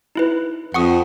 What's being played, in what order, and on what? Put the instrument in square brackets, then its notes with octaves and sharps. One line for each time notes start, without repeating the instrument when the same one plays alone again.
[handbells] D#4 E4 B4
[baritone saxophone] F2 [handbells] F#5 C#6 D#6